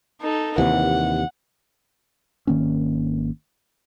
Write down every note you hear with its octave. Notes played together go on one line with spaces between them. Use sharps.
D#4 A4
D#2 C3 E3 F#5
G#1 D#3 A#3 C#4